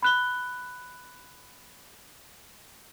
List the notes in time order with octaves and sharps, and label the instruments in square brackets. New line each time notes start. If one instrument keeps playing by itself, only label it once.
[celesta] B5 F#6 G7